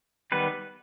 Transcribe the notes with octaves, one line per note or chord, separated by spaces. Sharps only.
D#3 G3 B3 B4